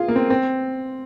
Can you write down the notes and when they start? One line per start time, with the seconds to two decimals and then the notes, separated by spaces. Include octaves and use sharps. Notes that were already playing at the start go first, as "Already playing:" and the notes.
Already playing: F4 G#4
0.08 A#3
0.16 C4
0.30 C4